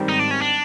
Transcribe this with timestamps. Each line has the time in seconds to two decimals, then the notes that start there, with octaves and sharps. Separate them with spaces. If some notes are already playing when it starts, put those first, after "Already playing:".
Already playing: G#2 D#3 G3 C4
0.09 D#4
0.19 D4
0.31 C#4
0.41 D4